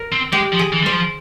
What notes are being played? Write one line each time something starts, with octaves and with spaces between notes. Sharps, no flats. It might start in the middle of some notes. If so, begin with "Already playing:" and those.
Already playing: A#4
C4
G#3 G4
F3
G#4
E3
G3 C5
F3